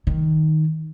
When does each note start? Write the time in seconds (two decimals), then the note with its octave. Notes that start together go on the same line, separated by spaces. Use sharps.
0.07 D#3